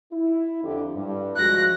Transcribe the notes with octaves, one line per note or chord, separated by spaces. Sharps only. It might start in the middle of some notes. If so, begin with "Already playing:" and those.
E4
F2 D3 G4
G2
F3 G#3 F#4 F#6 A#6